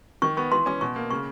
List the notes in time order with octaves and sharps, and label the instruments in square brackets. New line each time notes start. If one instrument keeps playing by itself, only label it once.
[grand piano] D#3 [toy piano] C#6
[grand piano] B3 [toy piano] C#6
[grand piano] E3 [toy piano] C6
[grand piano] C#4 [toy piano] D6
[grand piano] B2 [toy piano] C#6
[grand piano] A#3
[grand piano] C#3 [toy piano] C#6